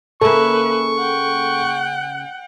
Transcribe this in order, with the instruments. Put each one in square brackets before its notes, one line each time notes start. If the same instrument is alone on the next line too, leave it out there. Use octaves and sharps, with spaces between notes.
[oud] C#3 A#3 [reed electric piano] A4 [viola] B4 E5 [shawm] C#6
[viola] F#5 G5